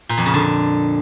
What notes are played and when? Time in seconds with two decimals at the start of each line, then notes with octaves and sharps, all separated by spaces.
0.09 A#2
0.18 F2
0.26 C#3
0.34 D3